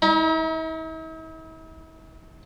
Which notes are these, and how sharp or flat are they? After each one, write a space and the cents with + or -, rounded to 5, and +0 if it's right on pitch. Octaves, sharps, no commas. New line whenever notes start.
E4 -45 A#5 +30